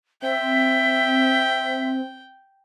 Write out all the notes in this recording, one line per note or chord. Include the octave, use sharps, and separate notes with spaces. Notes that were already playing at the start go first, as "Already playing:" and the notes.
C4 E5 G5